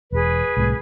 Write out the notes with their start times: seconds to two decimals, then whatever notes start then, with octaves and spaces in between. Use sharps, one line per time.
0.12 E1 G#4 B4
0.57 C2 A2